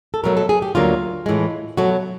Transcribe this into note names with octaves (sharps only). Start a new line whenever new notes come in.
A4
B2 F#3 A3 A#4
A4
G#4
G4
D2 D3 F#3 A#3 F4
A2 E3 G#3
B2 F#3 A3 F#4